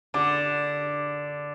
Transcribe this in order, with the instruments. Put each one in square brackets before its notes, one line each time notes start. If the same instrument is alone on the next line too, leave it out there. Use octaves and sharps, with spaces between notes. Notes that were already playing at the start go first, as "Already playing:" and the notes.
[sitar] D3 [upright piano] D6